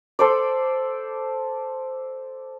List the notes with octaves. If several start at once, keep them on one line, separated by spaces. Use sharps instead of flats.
A4 C5 D5